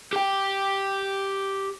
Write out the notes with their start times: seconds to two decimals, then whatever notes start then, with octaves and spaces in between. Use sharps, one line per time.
0.13 G4 G5